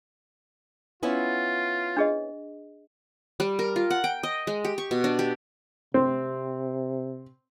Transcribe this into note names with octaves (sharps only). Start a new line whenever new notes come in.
B3 C#4 E4 F4
D4 G#4 D#5
G3
A#4
F4
F#5
G5
D#5
G#3
G4
C#6
B2
D4
G4
C3 C4